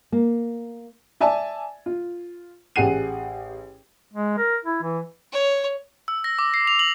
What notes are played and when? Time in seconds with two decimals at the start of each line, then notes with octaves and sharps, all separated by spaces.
0.12 A#3
1.21 D5 E5 G#5 A5
1.86 F4
2.76 A1 G4 G#4 F#5 C7 D#7
4.13 G#3
4.38 A#4
4.64 E4
4.83 E3
5.32 C#5
6.08 E6
6.24 A#6
6.39 D6
6.54 C7
6.67 F7
6.79 F#7